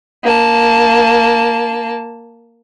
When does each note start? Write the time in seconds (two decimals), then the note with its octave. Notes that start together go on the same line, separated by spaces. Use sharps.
0.24 A#3 A5